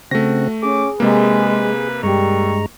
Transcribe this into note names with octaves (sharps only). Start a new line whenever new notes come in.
C#3 A3 C4 F#4 A#6
C#4 G#4 D6
C3 G#3 A#3 B4
G2 G3 G#3 A#5 C#6